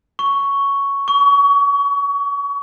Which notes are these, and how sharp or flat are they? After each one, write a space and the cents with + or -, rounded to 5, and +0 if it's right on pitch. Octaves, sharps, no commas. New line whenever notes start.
C#6 +5
C#6 +30